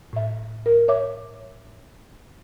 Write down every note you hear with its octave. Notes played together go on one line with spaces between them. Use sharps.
A2 E5
A#4
C#5 E5 D6